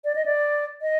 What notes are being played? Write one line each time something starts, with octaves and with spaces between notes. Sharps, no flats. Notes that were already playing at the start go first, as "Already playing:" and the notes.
D5
D#5
D5
D#5